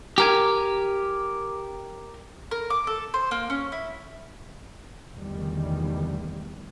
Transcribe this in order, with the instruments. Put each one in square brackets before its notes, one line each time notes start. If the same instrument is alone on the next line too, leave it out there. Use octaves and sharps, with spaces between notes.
[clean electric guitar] G4 A#4 G#5
[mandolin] A#4
D6
A4
C5
A#3
C#4
E4
[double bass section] F1 E2 D3 D#3 G3